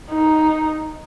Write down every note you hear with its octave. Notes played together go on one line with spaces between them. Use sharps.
D#4